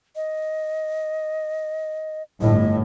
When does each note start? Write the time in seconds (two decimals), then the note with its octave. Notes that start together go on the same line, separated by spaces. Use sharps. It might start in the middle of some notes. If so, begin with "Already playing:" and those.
0.16 D#5
2.41 G1 A2 D#5